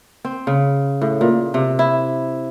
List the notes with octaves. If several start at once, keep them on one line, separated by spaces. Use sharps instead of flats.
C4
C#3
A2
A#2
C3
E4